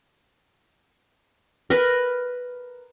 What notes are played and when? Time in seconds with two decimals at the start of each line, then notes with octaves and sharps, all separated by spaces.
1.70 A#4 B4